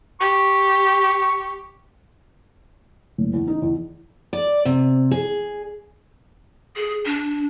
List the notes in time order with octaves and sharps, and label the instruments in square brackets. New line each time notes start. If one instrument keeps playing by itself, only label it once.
[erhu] G4 [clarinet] C#6
[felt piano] F#1
E2
D#4
E2
[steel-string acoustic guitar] D5
C3
G#4
[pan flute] G#4
D4